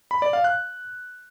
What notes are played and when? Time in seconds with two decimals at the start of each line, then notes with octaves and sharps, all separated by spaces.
0.11 B5
0.22 D5
0.33 F5
0.44 F#6